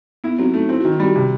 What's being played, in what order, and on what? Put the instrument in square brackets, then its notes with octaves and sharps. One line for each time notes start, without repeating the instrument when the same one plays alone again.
[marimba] B3 [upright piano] E4
[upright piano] F#3 [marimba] C4
[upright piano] A3 [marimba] D#4
[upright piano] C4 [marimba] E4
[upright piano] D#3 [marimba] F#4
[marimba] D#4
[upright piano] G3 [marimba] F#4
[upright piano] C3